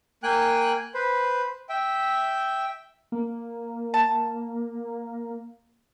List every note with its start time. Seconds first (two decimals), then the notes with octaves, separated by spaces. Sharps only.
0.23 A#3 G5 G#5 F#6
0.94 B4 C5
1.69 E5 G5
3.12 A#3
3.94 A5